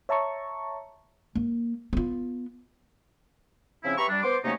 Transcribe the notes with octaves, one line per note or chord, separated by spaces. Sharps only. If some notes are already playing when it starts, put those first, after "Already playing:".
C#5 E5 A5 A#5 C#6
A#3
B3 F4
C#3 F3 C4 C#4 E4
G4 B4 E5 A#5 B5 C#6
G3 D4
B3 C5 C6 D6
C3 F#3 A3 A#3 C#4 D#4